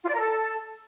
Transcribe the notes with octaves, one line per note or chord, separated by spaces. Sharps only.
F4
D5
A#4
A4